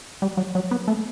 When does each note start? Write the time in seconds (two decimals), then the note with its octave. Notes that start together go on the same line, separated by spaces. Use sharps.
0.22 G3
0.37 F#3
0.55 F#3
0.71 B3
0.88 A3